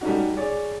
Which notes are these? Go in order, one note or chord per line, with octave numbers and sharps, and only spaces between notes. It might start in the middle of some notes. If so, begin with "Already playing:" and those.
G3 A3 C#4 D#4 F#4
G#4 C#5 D5